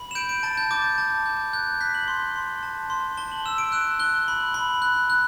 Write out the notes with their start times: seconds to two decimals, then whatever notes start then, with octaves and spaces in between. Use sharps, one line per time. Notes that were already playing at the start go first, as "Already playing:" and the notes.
Already playing: B5
0.11 E7
0.15 G6 D7
0.29 D7
0.43 A5 A6
0.57 G6
0.71 D6 A6
0.84 G6
0.98 A5
1.26 G6
1.53 F#6 G6
1.81 F#6 B6
1.94 F#7
2.08 C6
2.36 C6
2.63 A5
2.90 C6
3.17 A5 G7
3.32 F#7
3.46 E6 E7
3.58 D7
3.72 F#6 E7
4.00 F#6 G7
4.28 B5
4.54 B5
4.82 F#6
5.10 F#6